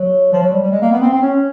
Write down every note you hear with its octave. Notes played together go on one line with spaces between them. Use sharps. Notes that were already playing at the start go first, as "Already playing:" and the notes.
Already playing: F#3
F3
F#3
G3
G3
G#3
A#3
B3
C4
C4
C#4